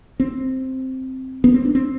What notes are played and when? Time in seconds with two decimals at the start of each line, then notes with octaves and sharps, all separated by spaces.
0.20 C4
1.44 B3
1.54 C4
1.65 D4
1.75 C4